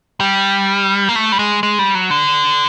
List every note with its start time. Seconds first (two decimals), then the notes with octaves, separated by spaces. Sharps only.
0.20 G3
1.09 A#3
1.16 A3
1.32 G3
1.39 G#3
1.63 G#3
1.79 G3
1.95 F#3
2.10 D3